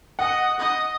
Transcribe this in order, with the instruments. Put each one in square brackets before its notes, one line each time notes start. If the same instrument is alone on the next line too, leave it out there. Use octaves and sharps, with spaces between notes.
[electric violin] D#5 [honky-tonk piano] F#5
[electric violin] D#5